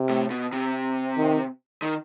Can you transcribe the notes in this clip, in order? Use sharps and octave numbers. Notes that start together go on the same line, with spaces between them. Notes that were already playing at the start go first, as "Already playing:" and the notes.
Already playing: C3
A2
B2
C3
D#3
D#3